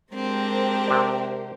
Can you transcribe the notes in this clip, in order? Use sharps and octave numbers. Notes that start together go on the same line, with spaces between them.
G#3 C4 D4 G4 A#4 C5
C3 D5